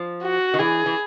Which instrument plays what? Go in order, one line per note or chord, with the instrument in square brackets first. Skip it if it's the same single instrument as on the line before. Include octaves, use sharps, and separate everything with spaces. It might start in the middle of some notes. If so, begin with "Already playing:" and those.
Already playing: [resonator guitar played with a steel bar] F3
[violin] F#4
[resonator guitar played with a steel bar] D#3
[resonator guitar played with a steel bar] E3 [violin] G#4
[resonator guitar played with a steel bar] E3